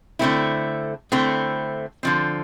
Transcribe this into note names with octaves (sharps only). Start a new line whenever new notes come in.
D3 A3 C4 E4
D3 A3 C4 E4
D3 F3 C4